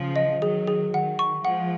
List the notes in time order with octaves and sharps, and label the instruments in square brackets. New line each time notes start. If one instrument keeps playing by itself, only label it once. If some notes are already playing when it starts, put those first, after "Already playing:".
Already playing: [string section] C#3 F3
[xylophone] D#5
[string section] D#3 F#3 [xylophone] G#4
[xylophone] G#4
[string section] D#3 [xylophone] F#5
[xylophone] C#6
[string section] F3 G#3 [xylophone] F#5